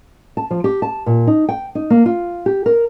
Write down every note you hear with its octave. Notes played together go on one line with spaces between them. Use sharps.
A5
F3
G4
A5
A#2
D#4
G5
D#4
A#3
F4
G4
A#4